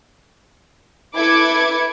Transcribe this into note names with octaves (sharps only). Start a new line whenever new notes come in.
E4 A4 B4 D6 G#6 C#7